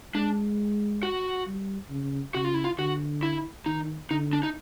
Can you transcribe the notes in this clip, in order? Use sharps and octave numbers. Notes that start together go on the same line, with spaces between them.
G#3 D4
F#4
G3
C#3
C#3 F#4
F4
E4
F4
D3 F#4
E4
D#3 D#4
D3 D#4
D4
D#4